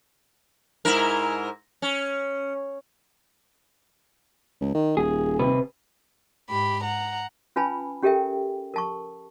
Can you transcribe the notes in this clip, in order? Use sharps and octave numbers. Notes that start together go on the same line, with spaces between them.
G#2 E4 A#4
C#4
C#2
D#3
D#1 G#4
C3 B4
G#2 G4 B5
F#5 A#5
C#4 F4 B4 G#5 A5 B5
C#4 G4 A4 A#4 E5 G5
A#4 A5 C#6